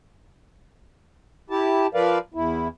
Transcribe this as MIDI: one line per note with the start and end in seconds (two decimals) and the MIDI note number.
1.50 1.87 64
1.50 1.87 67
1.50 1.87 81
1.94 2.18 53
1.94 2.18 70
1.94 2.18 71
1.94 2.18 74
1.94 2.18 77
2.34 2.68 40
2.34 2.68 64